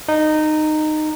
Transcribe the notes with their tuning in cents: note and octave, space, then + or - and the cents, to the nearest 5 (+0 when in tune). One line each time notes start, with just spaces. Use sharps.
D#4 -15